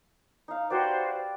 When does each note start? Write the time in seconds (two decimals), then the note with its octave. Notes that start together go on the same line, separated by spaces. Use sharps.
0.48 D#4 F5
0.70 F#4 G4 B4 C5 D5